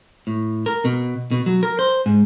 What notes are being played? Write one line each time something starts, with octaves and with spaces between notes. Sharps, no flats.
A2
A#4
B2
B2
F#3
A#4
C5
G#2